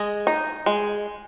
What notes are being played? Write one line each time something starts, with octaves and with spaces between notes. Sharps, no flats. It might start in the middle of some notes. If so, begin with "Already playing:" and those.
Already playing: G#3 D#5
D#4
G#3